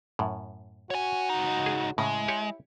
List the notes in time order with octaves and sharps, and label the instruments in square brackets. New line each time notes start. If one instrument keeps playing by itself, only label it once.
[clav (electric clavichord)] F#2 A2
[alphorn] F#4 [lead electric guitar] C#5 G#5
[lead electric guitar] C#2 D#4
[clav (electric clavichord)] G#4
[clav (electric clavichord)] A2 C#3 [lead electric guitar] G#3 [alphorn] E4
[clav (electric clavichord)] G4 C#5